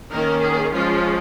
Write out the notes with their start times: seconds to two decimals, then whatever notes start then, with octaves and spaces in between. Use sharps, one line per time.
0.11 D#3 A#3 C#4 A#4
0.42 G#4
0.72 F3 G#3 C#4 F4